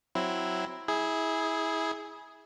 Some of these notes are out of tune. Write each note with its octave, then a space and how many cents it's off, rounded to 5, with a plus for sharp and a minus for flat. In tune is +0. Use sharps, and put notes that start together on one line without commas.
F#3 +0 C4 -5 E4 +0
E4 -25 G#4 +0